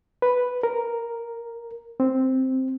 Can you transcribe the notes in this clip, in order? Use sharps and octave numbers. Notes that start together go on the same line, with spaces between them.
B4
A#4
C4